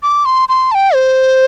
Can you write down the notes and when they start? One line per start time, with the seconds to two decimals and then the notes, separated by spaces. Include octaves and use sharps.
0.03 D6
0.25 C6
0.49 C6
0.71 A5
0.75 G5
0.94 C5